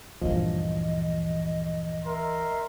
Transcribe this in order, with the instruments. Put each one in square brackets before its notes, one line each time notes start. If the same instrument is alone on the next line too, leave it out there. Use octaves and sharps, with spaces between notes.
[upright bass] D2 E3 [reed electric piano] G2 A#2 F3 [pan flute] D#5
[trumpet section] A#4 E5 C6